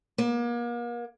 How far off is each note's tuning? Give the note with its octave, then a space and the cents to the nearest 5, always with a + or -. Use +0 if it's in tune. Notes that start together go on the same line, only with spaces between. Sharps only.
A#3 +40